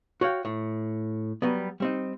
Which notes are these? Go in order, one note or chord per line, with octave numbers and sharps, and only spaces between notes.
F#4 C#5 F5 G5
A2
F#3 G3 B3
G3 C4 D#4